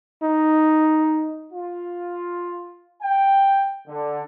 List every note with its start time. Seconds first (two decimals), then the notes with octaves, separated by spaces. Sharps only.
0.23 D#4
1.53 F4
3.02 G5
3.88 D3